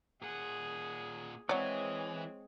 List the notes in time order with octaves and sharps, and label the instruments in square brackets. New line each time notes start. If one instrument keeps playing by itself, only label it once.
[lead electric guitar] A#2 F#5 [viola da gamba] G#4
[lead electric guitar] E3 [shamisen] F#3 D5 [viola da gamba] G#3 C4 G#4 [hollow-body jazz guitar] C#5